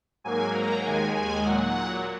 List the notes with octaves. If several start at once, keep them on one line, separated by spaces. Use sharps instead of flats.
G#2 F#3 A#3 G#5
A#5
D#2 D#3 G#3 G#5
G#5
A#2 F#3 F#5